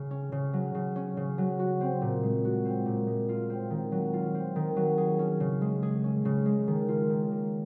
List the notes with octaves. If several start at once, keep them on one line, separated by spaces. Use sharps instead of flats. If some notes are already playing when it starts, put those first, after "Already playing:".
Already playing: C#3
C#4
C#3
F#3
C#3
C#4
C#3
F#3
F#4
C4
A#2
G#3
F#4
C4
A#2
G#3
F4
C4
D#3
F#3
F4
C4
D#3
F#3
G#4
C#4
C#3
G#3
G#4
C#4
C#3
G#3
D#3
F4
D#3
A#3